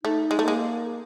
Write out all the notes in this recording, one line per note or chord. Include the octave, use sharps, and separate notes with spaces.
A3 D#4
G#3
A3
G#3 A#3